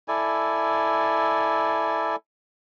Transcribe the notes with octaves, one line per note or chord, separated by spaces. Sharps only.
E4 A4 D5 G#5